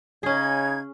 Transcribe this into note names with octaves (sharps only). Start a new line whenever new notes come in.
C#3 C#4 D#4 G#4 G#6